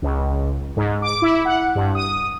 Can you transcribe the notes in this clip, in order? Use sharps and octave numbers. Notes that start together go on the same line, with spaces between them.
C#2
G#2
D6
E4
F#5
G2
D#6